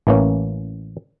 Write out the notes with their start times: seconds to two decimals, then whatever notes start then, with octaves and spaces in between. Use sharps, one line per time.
0.07 A1 E3 A#3 C#4